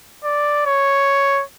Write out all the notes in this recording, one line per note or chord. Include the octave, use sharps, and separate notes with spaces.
D5
C#5